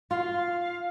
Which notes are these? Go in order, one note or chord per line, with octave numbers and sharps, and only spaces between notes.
F4 F5